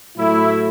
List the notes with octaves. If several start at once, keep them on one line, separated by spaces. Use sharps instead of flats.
A2 F#3 A3 E4